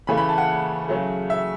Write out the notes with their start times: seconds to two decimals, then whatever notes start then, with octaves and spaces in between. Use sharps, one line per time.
0.07 C#3 E3 A3 B5
0.17 B5
0.29 A5
0.38 F#5
0.88 C#3 F#3 A3
1.30 E5